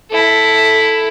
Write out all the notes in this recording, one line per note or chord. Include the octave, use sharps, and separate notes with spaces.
E4 A4